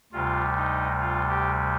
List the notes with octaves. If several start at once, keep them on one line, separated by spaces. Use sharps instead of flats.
D2 C3 G3 F4
D#4
F4
G4